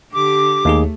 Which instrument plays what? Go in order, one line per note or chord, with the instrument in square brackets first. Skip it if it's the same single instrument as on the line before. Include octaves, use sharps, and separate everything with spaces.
[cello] D3 G4 [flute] D6
[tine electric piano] D#2 D#4 G#4 [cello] A3